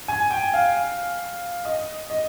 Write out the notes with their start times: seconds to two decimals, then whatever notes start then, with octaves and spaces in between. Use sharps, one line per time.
0.08 G#5
0.31 G5
0.54 F5
1.65 D#5
2.10 D#5